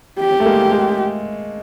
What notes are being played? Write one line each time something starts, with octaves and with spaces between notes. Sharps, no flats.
G4
A3
G#3 A#3
G#3